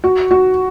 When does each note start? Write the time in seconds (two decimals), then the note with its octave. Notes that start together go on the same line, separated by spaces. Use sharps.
0.04 F#4
0.31 F#4